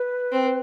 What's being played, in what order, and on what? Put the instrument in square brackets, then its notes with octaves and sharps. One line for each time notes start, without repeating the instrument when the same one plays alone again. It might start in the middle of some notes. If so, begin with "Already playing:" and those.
Already playing: [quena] B4
[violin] C4